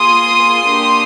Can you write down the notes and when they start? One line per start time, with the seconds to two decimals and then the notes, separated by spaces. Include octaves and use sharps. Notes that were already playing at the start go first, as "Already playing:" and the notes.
Already playing: A#3 F4 G#4 C6 D#6
0.66 A#3 D4 G4